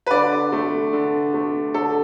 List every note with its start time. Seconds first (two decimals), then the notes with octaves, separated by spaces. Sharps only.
0.06 B4
0.11 D3 D5
0.52 A3
0.93 D3
1.34 A3
1.74 D3 A4